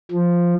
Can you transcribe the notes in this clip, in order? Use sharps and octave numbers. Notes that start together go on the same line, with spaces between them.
F3